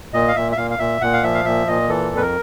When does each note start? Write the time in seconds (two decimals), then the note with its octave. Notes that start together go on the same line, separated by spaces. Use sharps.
0.13 A#2 D#5
0.28 F5
0.36 A#2 E5
0.52 E5
0.57 A#2 F5
0.70 F5
0.79 A#2 E5
1.01 A#2 F#5
1.13 F5
1.23 F3 E5
1.35 F5
1.45 A#2 E5
1.67 A#2 D#5
1.89 E3 A4
2.11 F2
2.17 B4
2.22 A#4